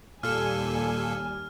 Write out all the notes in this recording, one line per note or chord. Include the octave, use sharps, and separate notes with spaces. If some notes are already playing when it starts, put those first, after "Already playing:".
D#2 A#2 G3 A4 G#5 F6